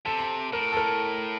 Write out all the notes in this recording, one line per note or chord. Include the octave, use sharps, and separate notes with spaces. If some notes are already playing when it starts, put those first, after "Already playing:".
C3 A4
A2 A#4
A4
A#4